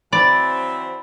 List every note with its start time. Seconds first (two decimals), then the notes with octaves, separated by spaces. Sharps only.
0.13 E3 F#3 C4 D5 B5